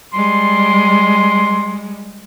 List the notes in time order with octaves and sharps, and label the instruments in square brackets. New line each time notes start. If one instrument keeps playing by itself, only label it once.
[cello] G3 G#3 [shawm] C6